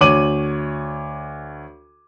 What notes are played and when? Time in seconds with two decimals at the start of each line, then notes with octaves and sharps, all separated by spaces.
0.01 D2 C#5 D6 D#7 F#7